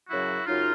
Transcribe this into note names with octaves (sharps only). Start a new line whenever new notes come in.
F#2 C#3 F#3 E4 F#4
F#2 C#3 F#3 D#4 F4